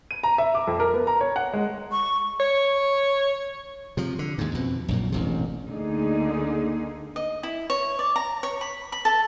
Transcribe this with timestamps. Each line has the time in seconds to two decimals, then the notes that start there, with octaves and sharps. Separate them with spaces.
0.11 D#7
0.23 A#5
0.38 E5
0.55 D6
0.67 F2
0.80 A#4
0.93 B3
1.07 A#5
1.21 C#5
1.36 F#5
1.53 G#3
1.92 C#6
2.40 C#5
3.97 C3 F3
4.19 D3
4.38 D#2 G#2
4.55 F2 B2
4.88 A#1 F#2 A#2
5.12 E1 A1 C3
5.67 D2 D3 A#3 D#4 G#4
7.16 D#5
7.43 E4
7.70 C#5
7.99 D5
8.16 A#5
8.43 C#5
8.61 B5
8.92 B5
9.05 A4